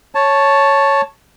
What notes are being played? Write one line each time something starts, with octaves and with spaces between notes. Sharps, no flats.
C#5 A5